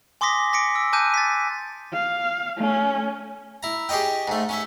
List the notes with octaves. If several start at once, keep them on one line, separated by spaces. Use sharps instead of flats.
G#5 C6 D6 D#6 A#6 B6
D6 A#6 B6 C#7 D7
E6
G#5 A5 D6 F#6 G6 D#7
A6 B6
F5
A3 C#4
E4 A#5
G4 G#4 C#5 D#5 G5
G#2 A3
C#4 C#5 E5